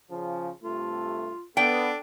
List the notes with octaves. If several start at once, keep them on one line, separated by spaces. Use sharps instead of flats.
C#3 F3
G2 C3 A3 F4
B3 D4 A4 G5